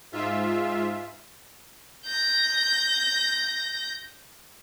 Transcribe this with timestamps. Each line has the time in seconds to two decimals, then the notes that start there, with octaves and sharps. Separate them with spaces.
0.12 G#2 F4 E5
2.06 G6 A#6